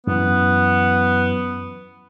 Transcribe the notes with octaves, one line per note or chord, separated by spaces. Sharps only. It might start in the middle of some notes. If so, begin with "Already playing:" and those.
F#2 E3 B3